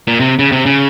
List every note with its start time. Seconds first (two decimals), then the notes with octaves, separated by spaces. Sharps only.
0.08 A#2
0.20 C3
0.39 C#3
0.52 C3
0.66 C#3